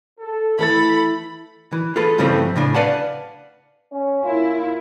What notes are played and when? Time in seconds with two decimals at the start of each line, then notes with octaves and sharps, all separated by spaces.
0.20 A4
0.59 E3 A3 E4 A4 B5 A6
1.72 E3
1.96 F4 G#4 A4 B4
2.18 G2 C#3 E3 F3 A3 C4
2.56 A2 C#3 D4
2.74 B4 D5 F5 F#5 A5
3.92 C#4
4.24 A#3 E4 F4